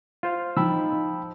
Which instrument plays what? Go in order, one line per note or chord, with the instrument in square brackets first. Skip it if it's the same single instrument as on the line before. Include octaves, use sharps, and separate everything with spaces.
[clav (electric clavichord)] F4 C5 F5
[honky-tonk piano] F3 [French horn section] D#4 [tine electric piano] G5 B5 E6